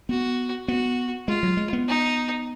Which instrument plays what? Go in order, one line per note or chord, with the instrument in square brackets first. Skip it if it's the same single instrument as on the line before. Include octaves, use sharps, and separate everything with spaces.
[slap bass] B3 [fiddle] F#4
[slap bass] B3 [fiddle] F#4
[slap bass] G#3 [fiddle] F4
[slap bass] F#3
G#3
B3
[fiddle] D#4